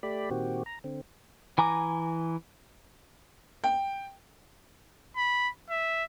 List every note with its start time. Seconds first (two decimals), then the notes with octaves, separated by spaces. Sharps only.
0.03 A3 G4 D5 B5
0.30 A#2 D#3 C4 F#4 G4
0.66 A#5
0.84 D3 C4
1.58 E3 G#5 A#5 D6
3.64 G5
5.16 B5
5.70 E5